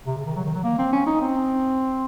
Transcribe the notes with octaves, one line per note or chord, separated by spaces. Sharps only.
C3
C#3
D#3
F#3
D#3
F#3
A#3
C4
C#4
D#4
C4